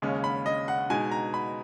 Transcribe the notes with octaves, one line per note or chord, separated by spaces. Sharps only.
D#2 C#3 G#3 C#4
B5
D#5
F#5
B2 G#3 D#4 G#5
A#5
B5